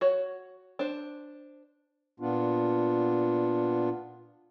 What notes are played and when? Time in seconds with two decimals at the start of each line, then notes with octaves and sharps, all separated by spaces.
0.01 F#4 C#5
0.79 D4 C5
2.20 A#2 B3 D4 F4